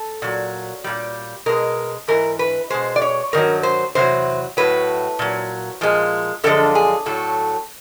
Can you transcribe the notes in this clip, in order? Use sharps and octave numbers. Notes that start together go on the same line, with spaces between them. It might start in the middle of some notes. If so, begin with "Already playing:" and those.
Already playing: A4
A#2 F#3
A#2 G3
B2 G#3 A#4
G#2 E3 A#4
B4
B2 G#3 C5
D5
C#5
G2 D#3 F#3 A#4
C5
E2 C3 F#3 C5
A2 F#3 B4
A#2 F#3
A#2 F3 G#3
F#2 D3 F3 G#3 A4
G#4
A2 F#3 A4